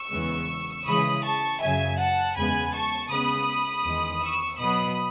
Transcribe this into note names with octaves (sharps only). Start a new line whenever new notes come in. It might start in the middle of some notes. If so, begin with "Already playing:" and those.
Already playing: C#6 E6
E2 C#3 E3 G#3 B3
C#3 E3 G#3 B5 D#6
A5 C#6
F#2 C#3 F#3 E5 G#5
F#5 A5
E2 C#3 G#3 B3 G#5 B5
A5 C#6
C#3 G#3 B3 B5 D#6
E2 D#3 G#3
C#6 E6
B2 F#3 B3 B5 D#6